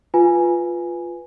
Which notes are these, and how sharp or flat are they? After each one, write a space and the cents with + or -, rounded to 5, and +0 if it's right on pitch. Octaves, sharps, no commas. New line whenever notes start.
F4 +0 B4 +0 G#5 +0